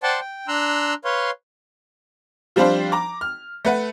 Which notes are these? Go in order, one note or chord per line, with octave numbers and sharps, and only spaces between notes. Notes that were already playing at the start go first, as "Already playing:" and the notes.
C5 D5 F#5 G5 A5 C6
G5
D4 A#5 C6 E6 F#6
B4 C#5 F5 C6
F3 G3 C4 D4 F4 C5
A#5 D6
F6
A3 B4 F#5